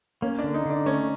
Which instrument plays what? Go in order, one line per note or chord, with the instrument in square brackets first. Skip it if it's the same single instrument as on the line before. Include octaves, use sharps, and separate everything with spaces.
[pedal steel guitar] A#3 [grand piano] C#4
[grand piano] D4
[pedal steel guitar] D3
[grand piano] D#4
[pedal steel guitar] D3 [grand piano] D4
[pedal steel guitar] A3 [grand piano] C#4